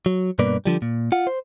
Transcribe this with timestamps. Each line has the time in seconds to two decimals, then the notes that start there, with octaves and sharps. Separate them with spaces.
0.06 F#3
0.39 G2 B2 A#3 B4 D5
0.66 D3 F3 G3
0.82 A#2
1.12 F4 F#5
1.27 C5